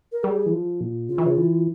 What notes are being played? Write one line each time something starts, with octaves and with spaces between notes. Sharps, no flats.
A#4
G3 G#4
E3
F3
A#2
C#3 F4
E3
C#3
E3